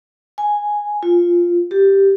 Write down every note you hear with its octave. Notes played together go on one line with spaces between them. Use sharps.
G#5
F4
G4